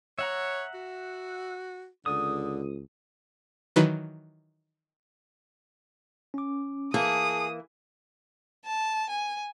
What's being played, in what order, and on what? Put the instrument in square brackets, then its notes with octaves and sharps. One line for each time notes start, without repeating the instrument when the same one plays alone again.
[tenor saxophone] C#5 [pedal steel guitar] E5 F#5 A#5
[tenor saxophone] F#4
[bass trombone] C#2 [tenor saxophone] D3 [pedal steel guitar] D#6
[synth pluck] D#3 E3 F#3 B4
[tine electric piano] C#4 D6
[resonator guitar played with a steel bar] E3 A#3 [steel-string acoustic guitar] G#4 [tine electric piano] A5 [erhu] D#6
[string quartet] A5
G#5